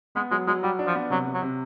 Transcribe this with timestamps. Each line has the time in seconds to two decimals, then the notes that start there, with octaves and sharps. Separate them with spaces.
0.16 G#3 B3
0.31 F#3 G#3
0.47 F#3 G#3
0.63 G3 F#4
0.79 D4
0.87 F3
0.95 B3
1.10 C3 F#3
1.27 C3
1.34 F#3
1.42 C3